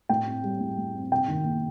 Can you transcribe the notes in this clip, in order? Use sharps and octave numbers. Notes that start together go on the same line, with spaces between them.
A2 G5
C4
G3
A2
A2
C4
C3 G5
D#3
A#3